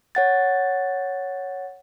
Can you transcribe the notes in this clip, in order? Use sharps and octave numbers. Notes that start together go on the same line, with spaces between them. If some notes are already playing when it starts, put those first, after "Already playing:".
C#5 F#5 A6